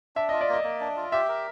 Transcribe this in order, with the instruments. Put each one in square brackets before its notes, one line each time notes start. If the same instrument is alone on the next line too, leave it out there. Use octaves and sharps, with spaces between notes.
[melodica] D4 [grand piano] E5
[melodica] F4 [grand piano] D#5
[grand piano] D5
[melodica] A#3 [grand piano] D#5
[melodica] A#3
D4
F4
[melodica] G4 [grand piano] E5
[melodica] A#4